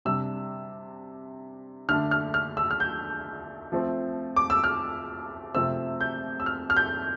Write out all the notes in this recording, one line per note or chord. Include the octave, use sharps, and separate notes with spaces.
C3 G3 D4 E6
D3 A3 D4 F6
F6
F6
E6
F6
G6
F3 A3 C4
D6
E6
F6
C3 F3 A3 C4 E6
G6
E6
F6
F6
G6